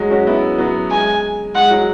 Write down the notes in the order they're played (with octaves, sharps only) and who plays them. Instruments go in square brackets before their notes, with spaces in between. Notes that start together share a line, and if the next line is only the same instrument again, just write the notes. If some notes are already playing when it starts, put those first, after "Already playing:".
Already playing: [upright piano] F#3 G#3
C#4 F#4
B3 E4
F#3 B3
[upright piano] G#3 [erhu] G#5
[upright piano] G#3 [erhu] F#5
[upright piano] F#3